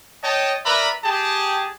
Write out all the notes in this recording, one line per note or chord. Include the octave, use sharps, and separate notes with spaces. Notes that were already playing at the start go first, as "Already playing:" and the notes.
C#5 D#5 G5 A5
A#4 B4 D5 E5 A#5 B5
G4 G#4 G5 A5